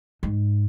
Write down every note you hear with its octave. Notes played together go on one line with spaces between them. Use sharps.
G#2